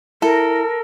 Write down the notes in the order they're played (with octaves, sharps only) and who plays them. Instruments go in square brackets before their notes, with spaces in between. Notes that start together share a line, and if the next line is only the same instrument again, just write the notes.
[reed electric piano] E4 [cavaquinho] A4 [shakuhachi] A#4